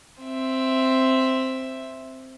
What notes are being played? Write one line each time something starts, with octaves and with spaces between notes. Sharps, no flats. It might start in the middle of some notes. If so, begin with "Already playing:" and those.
C4 E5